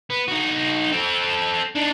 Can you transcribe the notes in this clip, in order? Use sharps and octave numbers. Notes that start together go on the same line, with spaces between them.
B3
D#4 F#4
C4 A4
D4 D#4